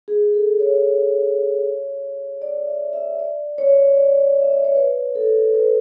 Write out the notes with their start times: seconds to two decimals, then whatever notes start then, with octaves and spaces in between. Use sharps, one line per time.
0.08 G#4
0.34 A4
0.60 C#5
2.42 D5
2.67 E5
2.93 E5
3.19 D5
3.58 C#5
3.97 D5
4.41 E5
4.52 D5
4.64 C#5
4.76 B4
5.15 A4
5.54 B4